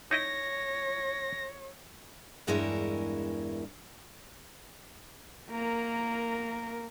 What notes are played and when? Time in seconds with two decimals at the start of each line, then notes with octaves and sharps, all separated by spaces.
0.11 D#4 E4 C#5 D#5 A#6
2.47 E2 G2 G#3 E4 A#4 C#5
5.51 A#3 A#4